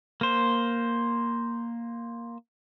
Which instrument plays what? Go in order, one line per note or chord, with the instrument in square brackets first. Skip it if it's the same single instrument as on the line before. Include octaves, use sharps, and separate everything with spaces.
[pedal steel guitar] A#3 C5